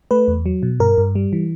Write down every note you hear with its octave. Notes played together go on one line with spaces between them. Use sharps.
A3 B4
E2
F#3
B2
G2 A#4
G2
G3
E3